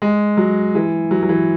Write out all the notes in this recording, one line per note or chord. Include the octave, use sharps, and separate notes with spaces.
G#3
F#3
E3
F#3
F#3
E3